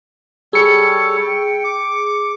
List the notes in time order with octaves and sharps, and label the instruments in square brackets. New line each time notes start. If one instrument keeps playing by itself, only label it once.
[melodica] G3 A4 C#5 [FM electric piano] G#4 C#7
[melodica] G5
D6